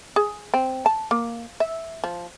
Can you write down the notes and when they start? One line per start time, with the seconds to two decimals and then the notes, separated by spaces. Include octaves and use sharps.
0.16 G#4
0.54 C4
0.86 A5
1.11 A#3
1.60 E5
2.04 F3